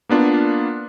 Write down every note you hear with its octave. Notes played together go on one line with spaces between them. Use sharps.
A#3 B3 D4 F4